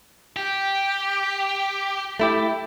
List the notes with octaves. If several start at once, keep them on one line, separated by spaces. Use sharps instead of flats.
G4 G5
A3 E4 G4